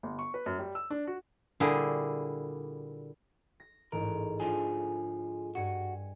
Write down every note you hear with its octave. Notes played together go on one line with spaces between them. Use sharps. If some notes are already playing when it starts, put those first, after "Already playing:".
G1
C#6
B4
F#2
G3
E6
D4
F#4
A#2 D3 G3 E4 G#4
A#6
A1 G#2 A#4
D3 F3 G#4 G#5
G2 F#4 G#5 C#7